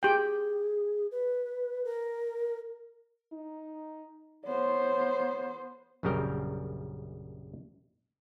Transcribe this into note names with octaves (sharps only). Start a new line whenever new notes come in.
G4 G#4 G5
B4
A#4
D#4
B3 C5 C#5
A#1 F#2 C#3 G3 A#4 G5